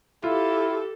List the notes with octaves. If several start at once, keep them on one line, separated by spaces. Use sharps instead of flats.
E4 F4 G4 A4